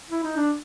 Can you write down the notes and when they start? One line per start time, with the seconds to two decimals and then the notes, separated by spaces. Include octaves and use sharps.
0.10 E4
0.24 D#4
0.36 D4